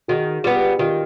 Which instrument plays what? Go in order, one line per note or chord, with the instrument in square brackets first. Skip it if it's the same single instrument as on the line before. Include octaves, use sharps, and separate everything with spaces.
[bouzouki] D#3 [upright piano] F#4 G#4
[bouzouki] G3 B3 [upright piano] F4 G4
[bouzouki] D#3 [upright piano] F4 G4